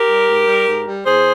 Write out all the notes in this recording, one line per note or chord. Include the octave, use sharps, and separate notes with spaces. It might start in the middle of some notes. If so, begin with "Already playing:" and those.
Already playing: G4 A#4
G3
G#2
G3
G#2
G3
E2 G#4 C5